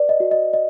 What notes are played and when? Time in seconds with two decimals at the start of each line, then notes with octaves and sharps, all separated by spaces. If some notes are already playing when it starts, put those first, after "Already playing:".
Already playing: B4 D5
0.09 D#5
0.20 F#4
0.31 D#5
0.53 D5 D#5